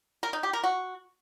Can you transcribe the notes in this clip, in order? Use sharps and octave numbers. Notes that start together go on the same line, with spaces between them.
A#4
D#4
G4
A#4
F#4